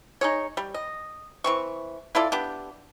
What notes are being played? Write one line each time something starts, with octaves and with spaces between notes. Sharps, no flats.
D#4 G#4 C#5
G3
D#5
E3 C4 C#6
E4 F4 A4 D5
B3 D4 G4